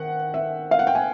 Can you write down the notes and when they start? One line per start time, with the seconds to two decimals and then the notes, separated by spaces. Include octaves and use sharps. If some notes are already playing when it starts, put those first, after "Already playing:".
Already playing: D#3 F#5
0.34 E5
0.71 F5
0.79 F#5
0.87 G5
0.95 G#5